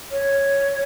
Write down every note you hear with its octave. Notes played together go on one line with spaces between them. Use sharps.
C#5